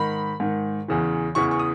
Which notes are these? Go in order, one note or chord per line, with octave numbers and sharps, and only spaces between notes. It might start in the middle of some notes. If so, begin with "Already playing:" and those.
Already playing: G#2 D#3 B5
G#2 D#3
E2 C#3 E3
E2 C#3 E3 C#6
C#6
D#6